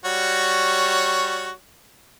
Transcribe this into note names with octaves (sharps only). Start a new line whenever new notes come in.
G3 F#4 C#5